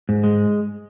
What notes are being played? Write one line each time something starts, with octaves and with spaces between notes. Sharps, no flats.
G#2
G#3